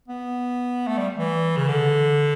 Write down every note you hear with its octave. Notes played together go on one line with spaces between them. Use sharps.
B3
A3
G3
E3
C#3
D3